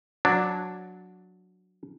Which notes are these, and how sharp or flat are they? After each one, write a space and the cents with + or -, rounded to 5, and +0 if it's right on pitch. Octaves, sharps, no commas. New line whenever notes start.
F#3 -15 D4 +0